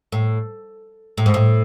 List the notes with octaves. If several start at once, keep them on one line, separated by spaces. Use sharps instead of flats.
A2
A2
G#2
A2